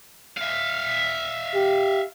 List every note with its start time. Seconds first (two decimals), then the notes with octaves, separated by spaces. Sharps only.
0.38 E5 F5
1.55 G4